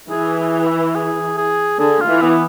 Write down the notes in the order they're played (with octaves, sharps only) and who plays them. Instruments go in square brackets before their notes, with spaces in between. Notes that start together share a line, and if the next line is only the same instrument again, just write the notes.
[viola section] E3 [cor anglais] G#4
[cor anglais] G#4
E4
G#4
G#4
[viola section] D3 [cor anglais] G#4
[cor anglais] F4
[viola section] E3
[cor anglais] B3